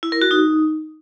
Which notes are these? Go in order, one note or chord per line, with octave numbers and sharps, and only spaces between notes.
E4
A#4
F#4
D#4